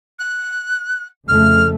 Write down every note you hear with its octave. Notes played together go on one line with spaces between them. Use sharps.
F#6
F2 C#3 A3 F6